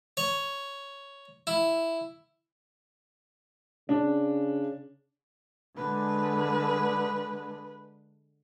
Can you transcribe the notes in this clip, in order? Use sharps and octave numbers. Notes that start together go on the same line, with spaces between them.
C#5
E4
C#3 D4
D3 G#3 B4